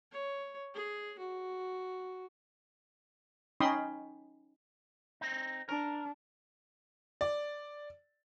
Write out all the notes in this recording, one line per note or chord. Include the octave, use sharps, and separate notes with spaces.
C#5
G#4
F#4
C#4 D#4 G5 B5 C6 D#6
C4 D#4
D4 A#4
D5